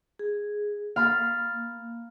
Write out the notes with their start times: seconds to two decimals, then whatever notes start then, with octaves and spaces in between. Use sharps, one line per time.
0.19 G#4
0.96 A#3 F5 B5 A6